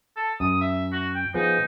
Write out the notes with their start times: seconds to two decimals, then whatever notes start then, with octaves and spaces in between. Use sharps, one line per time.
0.17 A4
0.40 F#2 D#6
0.61 E5
0.92 F#4
1.15 G5
1.34 F3 B3 D#4 G#4